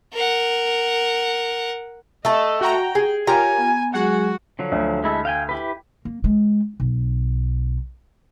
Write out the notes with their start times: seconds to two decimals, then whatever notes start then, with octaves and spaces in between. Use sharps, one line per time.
0.14 A#4 F#5
2.25 A3 D#5 A5
2.61 F#4 G5 A#5
2.95 G#4
3.27 F4 G4 A#4 C#5 F5 G#5 A#5
3.58 B3
3.94 F#3 G#3 F#4 G#4 F#5
4.59 D3 F3 F#3
4.72 D2
5.04 G#3 E4 A4
5.25 F5 G5 G#5
5.49 E4 G4 B4
6.05 A#3
6.24 G#3
6.80 B1